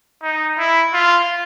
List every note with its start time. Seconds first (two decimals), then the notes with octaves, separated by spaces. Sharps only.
0.23 D#4
0.58 E4
0.94 F4